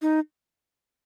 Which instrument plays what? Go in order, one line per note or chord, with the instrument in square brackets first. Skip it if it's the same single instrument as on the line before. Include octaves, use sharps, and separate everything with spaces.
[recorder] D#4